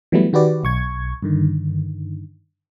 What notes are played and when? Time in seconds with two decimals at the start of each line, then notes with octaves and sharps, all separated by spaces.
0.12 E3 F#3 G3 A3 B3 E4
0.33 D#3 F#4 G4 B4 D5
0.63 B1 C#6 G#6
1.22 G2 D3 D#3